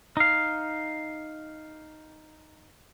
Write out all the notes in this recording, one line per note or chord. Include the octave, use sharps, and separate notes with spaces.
D#4 F5